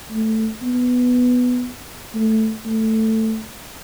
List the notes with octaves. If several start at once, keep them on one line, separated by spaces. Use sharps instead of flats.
A3
B3
A3
A3